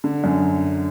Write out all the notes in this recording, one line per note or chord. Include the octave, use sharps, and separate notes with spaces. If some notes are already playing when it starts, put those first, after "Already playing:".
D3
F#2